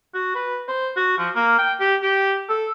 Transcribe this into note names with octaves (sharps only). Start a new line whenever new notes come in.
F#4
B4
C5
F#4
F3
A#3
G5
G4
G4
A4